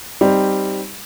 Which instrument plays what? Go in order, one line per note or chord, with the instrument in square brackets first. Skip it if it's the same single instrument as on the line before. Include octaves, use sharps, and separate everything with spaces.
[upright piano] G3 C4 D#4